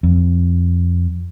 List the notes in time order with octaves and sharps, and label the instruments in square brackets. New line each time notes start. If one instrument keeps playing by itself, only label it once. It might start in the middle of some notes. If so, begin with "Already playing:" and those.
[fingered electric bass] F2